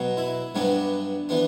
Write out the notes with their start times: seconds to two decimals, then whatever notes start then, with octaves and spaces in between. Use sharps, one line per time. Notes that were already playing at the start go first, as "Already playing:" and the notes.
Already playing: B2 F#3 B3
0.17 E4
0.55 G2 F#3 B3 D4
1.29 E3 B3 D4